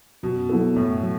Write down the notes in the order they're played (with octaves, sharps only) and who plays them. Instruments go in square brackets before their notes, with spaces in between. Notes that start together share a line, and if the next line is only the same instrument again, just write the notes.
[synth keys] F#2 [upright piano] B2
[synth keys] F#3 B3 E4 A4
[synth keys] F#2 [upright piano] A2
[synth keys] F#3